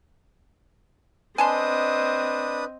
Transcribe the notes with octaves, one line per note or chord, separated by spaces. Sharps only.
C4 D4 B4 D#5 G#5 A5 C6 D#6